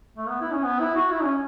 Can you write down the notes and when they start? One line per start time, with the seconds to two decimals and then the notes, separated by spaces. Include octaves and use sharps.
0.17 A3
0.29 B3
0.41 E4
0.52 C#4
0.64 B3
0.80 E4
0.95 F#4
1.11 E4
1.23 C#4